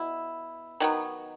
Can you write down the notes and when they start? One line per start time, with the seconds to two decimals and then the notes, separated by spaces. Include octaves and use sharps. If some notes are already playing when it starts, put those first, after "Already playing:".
Already playing: B2 E4
0.80 D#3 F#3 B3